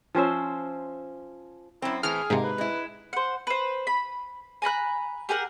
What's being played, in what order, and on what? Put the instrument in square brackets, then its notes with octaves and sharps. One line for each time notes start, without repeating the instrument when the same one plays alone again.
[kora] F3 C#4 C5 E5
[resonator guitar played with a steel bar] F#2 C4 [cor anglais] E4
[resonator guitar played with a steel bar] A2 E3 C4 [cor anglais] G#4 [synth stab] F6
[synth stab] G#2 C3 [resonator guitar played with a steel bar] A#3
[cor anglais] B4
[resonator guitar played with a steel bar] G#3 E4
[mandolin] C5 F#5
B4 C5
B5
G#5 A#5 B5 F#6
G4 G#4 A#4 F#5